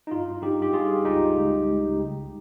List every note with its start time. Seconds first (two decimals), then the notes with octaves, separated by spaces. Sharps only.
0.07 D#4
0.11 G2 F4
0.42 G2 D#4 G4
0.62 G4
0.73 G3 F4 G#4
1.04 C#2 D#4 G4
1.36 C#2
1.67 C#2
1.98 C2